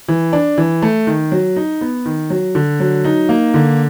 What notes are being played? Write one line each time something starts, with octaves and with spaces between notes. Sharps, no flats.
E3
D4
E3
A3
D#3
F#3
D#4
B3
D#3
F#3
D3
F#3
D#4
A#3
D3